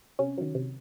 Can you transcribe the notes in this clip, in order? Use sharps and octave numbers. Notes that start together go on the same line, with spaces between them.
C3 C#4
D#3 F#3
C3